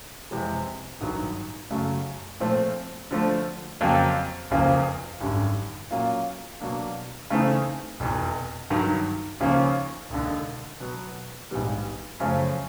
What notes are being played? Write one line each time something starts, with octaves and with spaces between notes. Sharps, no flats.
F2 C3 E3 G#3
A1 G2 D#3 F#3
F#2 C#3 F#3 A3
A#2 F3 A3 C4
D3 F3 A3
F2 C#3 F#3 A#3
F1 E2 C#3 F3 A#3
G#1 F#2 D3 G3
A#2 F#3 A#3 C#4 F4
B2 F#3 A#3 D4
C#3 E3 A3 C4 D#4
F1 E2 B2
G2 D#3 F#3
D#2 C#3 F3 A#3 C#4
E1 D#2 D3
B2 F#3 B3
A#1 G#2 D#3 G3 B3
F#2 C#3 F3 A3 C#4